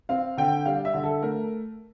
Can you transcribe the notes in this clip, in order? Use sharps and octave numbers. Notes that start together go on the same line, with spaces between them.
C4 F5
D3 G5
G3 F5
E5
D3
A4
A3 A#4